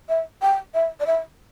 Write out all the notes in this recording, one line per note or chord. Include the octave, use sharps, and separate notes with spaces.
E5
G5
E5
D5
E5